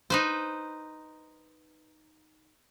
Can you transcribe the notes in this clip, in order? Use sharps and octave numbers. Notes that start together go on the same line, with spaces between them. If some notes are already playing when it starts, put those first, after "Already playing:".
D#4 B4 C5